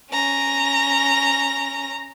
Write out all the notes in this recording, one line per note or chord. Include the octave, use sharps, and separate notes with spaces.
C#4 A#5